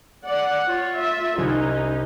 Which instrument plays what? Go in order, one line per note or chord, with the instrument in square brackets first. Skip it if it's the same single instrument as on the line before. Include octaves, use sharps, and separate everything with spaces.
[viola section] D5 F#5
[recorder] F4 [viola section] C#5
[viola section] E5
[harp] C2 F#6 G#6 [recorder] C#4 [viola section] D#4